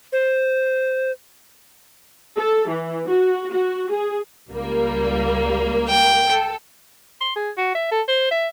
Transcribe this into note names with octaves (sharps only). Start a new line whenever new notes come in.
C5
A4
E3
F#4
F#4
G#4
C#2 G3 A#3
G5
A4
C6
G#4
F#4
E5
A4
C5
E5